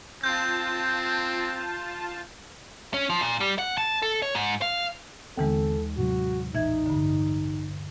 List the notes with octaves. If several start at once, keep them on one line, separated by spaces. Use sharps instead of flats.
C4 F4 A5 G6
C#4
F3
A#2
G3
F#5
A5
A4
C#5
G#2
F5
D#2 D3 E3 G#3 B3 C4 A4
A2 C3 F#3 F#4
A1 A#2 E3 D#4 E5 G#6
G2 D3